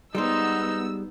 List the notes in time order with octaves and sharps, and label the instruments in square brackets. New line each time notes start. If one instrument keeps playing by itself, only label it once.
[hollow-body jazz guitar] G3 G#3 C5 [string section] B3 E6 [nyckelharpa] D#4